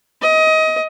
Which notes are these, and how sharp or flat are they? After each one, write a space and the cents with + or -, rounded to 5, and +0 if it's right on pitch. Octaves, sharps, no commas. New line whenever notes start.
D#5 +25